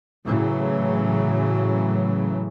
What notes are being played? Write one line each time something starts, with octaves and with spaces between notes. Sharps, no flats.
A2 C#3 E3 F#3